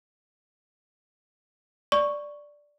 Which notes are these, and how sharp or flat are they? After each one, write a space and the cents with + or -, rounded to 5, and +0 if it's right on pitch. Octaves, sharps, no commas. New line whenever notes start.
D5 +0 C#6 +0